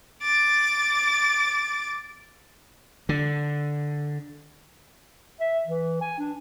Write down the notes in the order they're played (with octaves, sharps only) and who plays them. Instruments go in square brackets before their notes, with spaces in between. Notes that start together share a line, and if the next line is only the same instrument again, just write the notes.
[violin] D6 A6
[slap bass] D3
[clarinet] E5
E3
G#5
D4